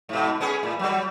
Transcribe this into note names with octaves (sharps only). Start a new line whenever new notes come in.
G#2 B2
B3 C#4 G#4
A2
F#3 G3